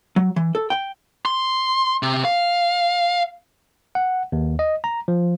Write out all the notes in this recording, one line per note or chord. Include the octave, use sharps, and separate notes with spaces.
F#3
E3
A4
G5
C6
C3
F5
F#5
D#2
D#5
A#5
F3